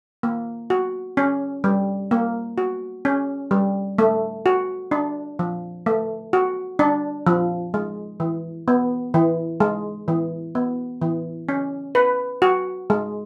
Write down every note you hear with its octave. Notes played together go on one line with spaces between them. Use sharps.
A#3
F#4
C#4
G3
A#3
F#4
C#4
G3
A3
F#4
D4
F3
A3
F#4
D4
F3
G#3
E3
B3
E3
G#3
E3
B3
E3
C#4
B4
F#4
G#3